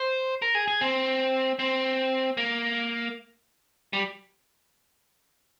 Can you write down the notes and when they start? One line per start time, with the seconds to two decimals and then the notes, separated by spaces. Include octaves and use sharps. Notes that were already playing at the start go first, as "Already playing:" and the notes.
Already playing: C5
0.42 A#4
0.55 G#4
0.68 G#4
0.81 C4
1.59 C4
2.37 A#3
3.93 G3